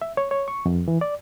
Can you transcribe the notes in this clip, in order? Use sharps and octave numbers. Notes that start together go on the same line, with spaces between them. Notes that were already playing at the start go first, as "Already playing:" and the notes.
E5
C#5
C#5
C#6
F2
E3
D5